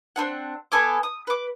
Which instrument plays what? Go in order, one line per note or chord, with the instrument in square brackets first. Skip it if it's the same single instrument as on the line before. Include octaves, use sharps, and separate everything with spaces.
[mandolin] C4 D4 F#5
B3 A4 G#5 D6
D#6
B4 D6